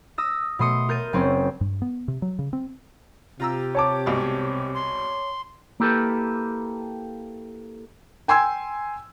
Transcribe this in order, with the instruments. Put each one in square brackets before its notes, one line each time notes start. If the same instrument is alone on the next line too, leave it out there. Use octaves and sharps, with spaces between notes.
[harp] D#6 E6 A#6
B2 A3 C6 D#6 C#7
A#4 G6 A6 D#7
F#1 C4 C#4
[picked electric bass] G2
B3
C3
F#3
C#3
C4
[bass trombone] C3 [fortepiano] F4 A#5 E6 [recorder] G4
[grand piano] C#5 A5 D6
[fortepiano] C2 G#2 B2
[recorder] C6
[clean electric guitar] A#3 E4 G4 A4 B4
[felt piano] G5 G#5 C6 E6 G#6